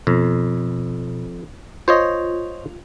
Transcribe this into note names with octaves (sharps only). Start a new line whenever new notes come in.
F2 B2
F4 C5 C#5 D#5